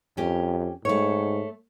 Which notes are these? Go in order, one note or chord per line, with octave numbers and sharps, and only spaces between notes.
F2 C#4 G4
G#2 A3 C#5